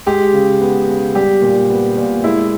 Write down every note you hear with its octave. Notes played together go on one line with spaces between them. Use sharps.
G#3 G4
C#3
B3
C#3
G3 G4
A#2
B3
A#2
G#3 E4